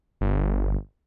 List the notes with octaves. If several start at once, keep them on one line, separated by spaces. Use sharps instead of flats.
G1